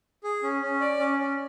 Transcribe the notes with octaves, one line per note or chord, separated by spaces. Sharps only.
G#4
C#4
C#4
D5
C#4
C#4